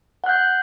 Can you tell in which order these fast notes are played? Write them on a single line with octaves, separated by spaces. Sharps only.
F#5 F#6 G6